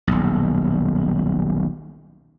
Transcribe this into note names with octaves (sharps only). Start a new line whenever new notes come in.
D#1 B1